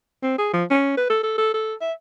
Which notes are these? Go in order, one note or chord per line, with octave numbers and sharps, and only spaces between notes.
C4
G#4
F3
C#4
B4
A4
A4
A4
A4
E5